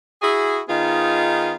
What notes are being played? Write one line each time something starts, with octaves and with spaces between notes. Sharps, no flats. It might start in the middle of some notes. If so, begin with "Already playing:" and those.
E4 F#4 G#4
D#3 B3 D#4 F4 G#4